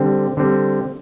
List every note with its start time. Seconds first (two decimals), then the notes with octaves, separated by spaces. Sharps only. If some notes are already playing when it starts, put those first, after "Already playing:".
Already playing: D3 G3 C4
0.37 D3 G3 C4